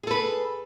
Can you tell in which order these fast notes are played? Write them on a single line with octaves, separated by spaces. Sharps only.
G#4 A4 B4